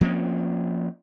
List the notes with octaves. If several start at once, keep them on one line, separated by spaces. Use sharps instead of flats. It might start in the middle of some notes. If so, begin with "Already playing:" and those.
F3 A#3 C4 C#4